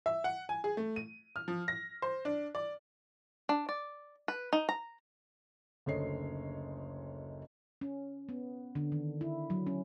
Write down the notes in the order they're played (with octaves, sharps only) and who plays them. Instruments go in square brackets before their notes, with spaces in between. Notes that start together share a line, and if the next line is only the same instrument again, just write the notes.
[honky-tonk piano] E5
F#5
G#5
G#4
A3
D#7
F6
F3
A#6
C5
D4
D5
[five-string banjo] D4
D5
B4
D#4
A#5
[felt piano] F#1 D2 A4 C#5 D#5 C7
[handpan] C#4
B3
D3
D#3
E4
F#3
C#4